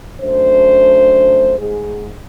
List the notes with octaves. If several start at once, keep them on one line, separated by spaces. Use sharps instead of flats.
F#2 A3 D4 C5
G#2 G#4